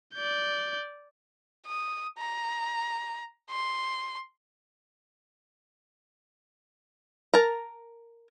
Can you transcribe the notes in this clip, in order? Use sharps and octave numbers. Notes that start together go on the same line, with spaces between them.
D5 G6
D#6
A#5
C6
A#4 A5 A#5